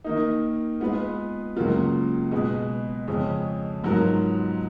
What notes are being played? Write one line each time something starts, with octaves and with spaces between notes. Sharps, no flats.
D#3 A#3 D#4
G#3 B3 F4 B4
C#2 C#3 F#3 A#3 F4
B2 G#3 B3
F2 C#3 G#3 C#4
G#2 F#3 B3 F4 A#4